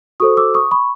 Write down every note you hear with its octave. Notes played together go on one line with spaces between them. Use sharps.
F#4 A4 C5 C#6 D#6
D6 E6
C#6 D#6
B5 C#6